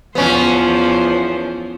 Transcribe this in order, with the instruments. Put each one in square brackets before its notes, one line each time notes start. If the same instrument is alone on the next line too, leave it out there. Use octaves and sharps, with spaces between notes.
[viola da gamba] E2 F3 C5 [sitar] B3 C#4